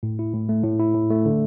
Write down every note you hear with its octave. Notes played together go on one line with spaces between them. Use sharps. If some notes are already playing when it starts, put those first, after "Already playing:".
A2
E4
A2
A3
A2
E4
A2
A3
D3